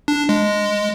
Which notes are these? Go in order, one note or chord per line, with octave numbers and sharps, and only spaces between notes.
D4
G#3